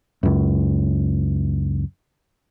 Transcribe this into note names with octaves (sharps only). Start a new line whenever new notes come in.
C#2 F#2